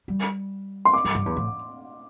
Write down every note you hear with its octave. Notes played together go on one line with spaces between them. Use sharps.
G3
C6
D6
G2
G2
E2
A2